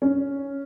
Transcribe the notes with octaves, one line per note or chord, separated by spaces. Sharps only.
C#4